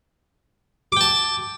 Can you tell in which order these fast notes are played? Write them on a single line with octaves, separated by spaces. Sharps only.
D6 G5 A5